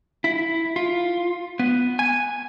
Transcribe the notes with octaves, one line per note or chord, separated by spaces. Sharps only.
E4
F4
B3
G#5